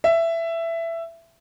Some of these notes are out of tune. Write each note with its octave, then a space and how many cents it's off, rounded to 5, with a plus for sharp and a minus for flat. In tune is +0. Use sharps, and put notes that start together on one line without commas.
E5 +15